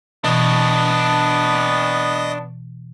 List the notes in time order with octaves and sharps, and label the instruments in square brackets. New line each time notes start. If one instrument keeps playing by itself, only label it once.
[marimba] B2 E3 [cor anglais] B3 [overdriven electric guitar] D4 C#5 [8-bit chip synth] D#5